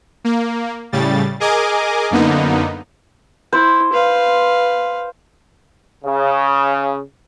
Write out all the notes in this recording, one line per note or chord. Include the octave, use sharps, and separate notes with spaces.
A#3
A2 C#3 G3 A6
G#4 A#4 D#5 G#5 D6
F#2 D3 A#3 B3 D#4
E4 C5
B4 F5
C#3